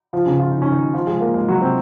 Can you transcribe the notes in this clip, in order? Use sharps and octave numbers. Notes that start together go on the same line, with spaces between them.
F3 F4
C#3 C#4
F4
D#4
C#4
D#3 D#4
F3 F4
G#3 G#4
A#3 A#4
G#3 G#4
F#3 F#4
C3 C4